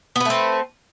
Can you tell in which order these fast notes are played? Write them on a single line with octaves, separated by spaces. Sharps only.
B3 B4 A3 C4